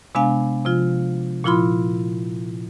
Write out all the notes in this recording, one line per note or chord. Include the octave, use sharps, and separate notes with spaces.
C3 G#3 B3 D4 F5 G#5
C3 F3 F4
A#2 F3 E4 F4 B5 C6